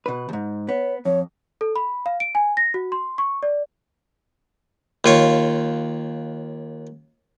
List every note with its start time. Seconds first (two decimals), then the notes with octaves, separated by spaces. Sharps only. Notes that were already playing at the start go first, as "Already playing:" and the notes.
0.06 B2 B4
0.29 D#2 G#2
0.69 B3 C#5
1.05 F2 C#5
1.61 A4
1.76 B5
2.06 F5
2.20 D7
2.35 G#5
2.57 A#6
2.74 F#4
2.92 C6
3.18 C#6
3.43 D5
5.04 D#2 F4 C#5